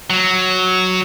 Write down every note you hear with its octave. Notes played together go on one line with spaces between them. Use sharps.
F#3